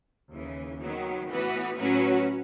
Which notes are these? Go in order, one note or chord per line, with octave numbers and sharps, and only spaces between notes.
D#2 C#3 E3
D#3 F#3 B3
A2 E3 B3 F#4 B4
A2 F#3 C#4 F#4 B4